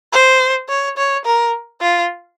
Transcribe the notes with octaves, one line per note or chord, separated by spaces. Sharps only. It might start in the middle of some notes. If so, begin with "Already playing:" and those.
C5
C#5
C#5
A#4
F4